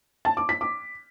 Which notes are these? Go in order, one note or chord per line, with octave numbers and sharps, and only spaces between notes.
A5
D6
B6
D6